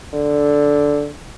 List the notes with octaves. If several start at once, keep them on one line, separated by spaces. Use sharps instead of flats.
D3